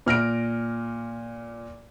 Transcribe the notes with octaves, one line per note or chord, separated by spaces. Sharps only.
A#2 F6 A#6 D7